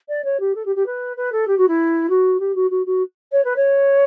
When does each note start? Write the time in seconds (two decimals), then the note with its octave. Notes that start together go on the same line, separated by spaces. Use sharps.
0.08 D5
0.24 C#5
0.39 G4
0.55 A4
0.65 G4
0.75 G4
0.86 B4
1.16 B4
1.32 A4
1.47 G4
1.57 F#4
1.68 E4
2.09 F#4
2.39 G4
2.55 F#4
2.70 F#4
2.86 F#4
3.32 C#5
3.44 B4
3.56 C#5